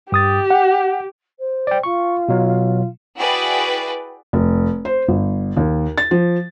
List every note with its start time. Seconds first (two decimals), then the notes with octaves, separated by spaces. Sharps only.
0.12 G2 G4 D#6 A6
0.50 F#5
1.38 C5
1.67 D5 G5
1.83 F4 C#6
2.29 B2 F#3
3.18 E4 F#4 G#4 B4 D5 G5
4.33 F1
4.85 C5
5.08 G1
5.57 D#2
5.98 A6
6.11 F3